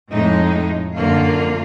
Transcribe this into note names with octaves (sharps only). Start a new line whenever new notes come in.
F2 A2 G#3 D#4
F#2 D3 A#3 F4 F5